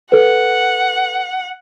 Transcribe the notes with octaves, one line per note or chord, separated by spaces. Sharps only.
A4 B4 F#5